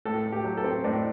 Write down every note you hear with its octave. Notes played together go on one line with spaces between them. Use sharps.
A2 A4
A2
G4
F#3
A4
C4
A2 D4